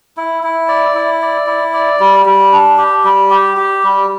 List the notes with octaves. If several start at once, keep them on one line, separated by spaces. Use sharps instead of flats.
E4
E4
D5
E4
D5
E4
D5
G3
G3
D4
G4
G3
G4
G4
G3